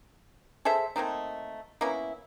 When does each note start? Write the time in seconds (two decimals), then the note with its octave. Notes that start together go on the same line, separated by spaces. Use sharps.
0.65 G#4 A4 C5 E5
0.96 A3 A#3 C4 D#4
1.81 A#3 B3 C#4 E4